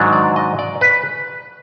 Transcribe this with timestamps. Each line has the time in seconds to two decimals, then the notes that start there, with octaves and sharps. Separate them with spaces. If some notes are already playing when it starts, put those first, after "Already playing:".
Already playing: G#2 D#3 F#3 D4
0.13 D5
0.36 D#5
0.59 D5
0.81 B4